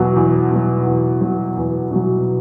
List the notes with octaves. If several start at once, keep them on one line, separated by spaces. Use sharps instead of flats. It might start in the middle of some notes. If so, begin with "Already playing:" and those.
Already playing: E2 B2 F#3
E2
B2 F#3
E2
B2 F#3
E2
B2 F#3